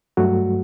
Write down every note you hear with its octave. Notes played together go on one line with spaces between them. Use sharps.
G2 F#3 A3 F#4